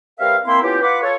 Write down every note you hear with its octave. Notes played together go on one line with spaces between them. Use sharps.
G3 C4 A#4 B4 E5 F5
A#3 C4 E4 C6
B3 C#4 E4 F4 G4
F4 B4 F#5 D6
F4 A4 C#5